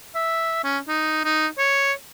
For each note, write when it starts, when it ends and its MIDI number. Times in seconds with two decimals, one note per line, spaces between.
0.15 0.59 76
0.64 0.79 61
0.88 1.20 63
1.25 1.47 63
1.58 1.93 73